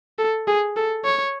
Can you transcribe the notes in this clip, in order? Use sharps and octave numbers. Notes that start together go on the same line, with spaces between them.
A4
G#4
A4
C#5